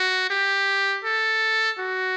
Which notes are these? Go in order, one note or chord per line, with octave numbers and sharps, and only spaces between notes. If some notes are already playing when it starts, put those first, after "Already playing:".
Already playing: F#4
G4
A4
F#4